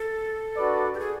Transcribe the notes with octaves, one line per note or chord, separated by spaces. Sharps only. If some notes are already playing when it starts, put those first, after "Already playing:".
Already playing: A4
D4 F#4 B4 D5
G4
G#4